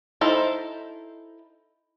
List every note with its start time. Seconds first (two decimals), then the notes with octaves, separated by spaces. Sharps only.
0.21 D#4 E4 A4 C5